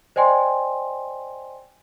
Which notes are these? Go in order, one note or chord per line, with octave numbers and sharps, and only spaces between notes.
C5 D5 D#5 G5 G#5 C6